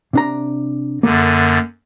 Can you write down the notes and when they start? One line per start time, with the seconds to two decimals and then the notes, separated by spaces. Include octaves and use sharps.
0.13 C3 D4 A#5
1.03 F#2 D3 A#3